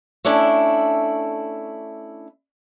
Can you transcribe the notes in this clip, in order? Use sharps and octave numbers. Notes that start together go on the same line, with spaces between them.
A3 C#4 D4 E4 A4